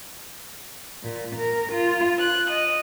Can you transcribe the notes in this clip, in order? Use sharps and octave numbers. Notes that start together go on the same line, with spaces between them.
A#2
A#4
F4
F#6
D#5